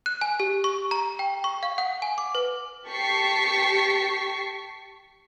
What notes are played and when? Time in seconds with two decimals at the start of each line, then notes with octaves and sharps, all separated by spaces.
0.06 F#6
0.21 G#5
0.40 G4
0.64 C#6
0.91 A#5
1.19 G5
1.44 C#6
1.63 F5
1.78 F#5
2.02 G#5
2.18 D6
2.35 B4
2.87 G4 A5 C#6 B6 C7